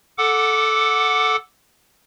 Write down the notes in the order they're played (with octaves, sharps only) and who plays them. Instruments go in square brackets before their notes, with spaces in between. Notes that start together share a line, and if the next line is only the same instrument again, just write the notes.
[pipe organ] A4 F#5 D6